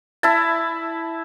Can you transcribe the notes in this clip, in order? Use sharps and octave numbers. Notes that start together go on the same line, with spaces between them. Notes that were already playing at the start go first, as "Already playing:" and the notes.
E4 A5